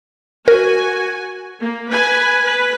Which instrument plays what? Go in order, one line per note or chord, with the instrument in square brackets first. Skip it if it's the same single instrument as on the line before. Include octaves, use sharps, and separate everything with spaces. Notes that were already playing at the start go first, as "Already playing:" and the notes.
[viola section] F#4 G#5 [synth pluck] A#4
[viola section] A#3
B4 G#5
B4